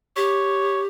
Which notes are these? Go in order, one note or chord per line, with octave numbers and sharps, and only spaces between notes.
G4 C#5